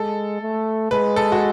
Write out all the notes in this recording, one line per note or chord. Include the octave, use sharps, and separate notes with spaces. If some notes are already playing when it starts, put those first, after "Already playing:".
Already playing: G#3 A4
A3
G#3 B4
A4
F#4